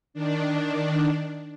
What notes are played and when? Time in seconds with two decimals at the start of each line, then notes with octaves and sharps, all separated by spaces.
0.14 D#3 D4